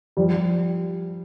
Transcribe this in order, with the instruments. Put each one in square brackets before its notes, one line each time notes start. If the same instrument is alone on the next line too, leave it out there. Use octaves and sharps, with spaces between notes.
[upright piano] F3 G3